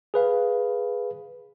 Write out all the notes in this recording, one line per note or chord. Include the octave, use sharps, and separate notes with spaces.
G#4 B4 F5